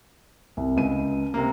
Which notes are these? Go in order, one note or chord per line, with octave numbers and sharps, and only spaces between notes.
C2
C#2 D#7
C3 A#3